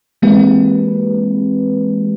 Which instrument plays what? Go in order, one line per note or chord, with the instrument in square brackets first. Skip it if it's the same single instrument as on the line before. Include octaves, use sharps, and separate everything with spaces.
[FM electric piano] E3 G#3 A#3 C4 G4 B4